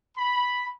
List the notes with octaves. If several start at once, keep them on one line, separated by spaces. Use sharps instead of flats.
B5